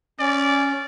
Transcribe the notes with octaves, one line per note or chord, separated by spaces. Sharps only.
C#4 D5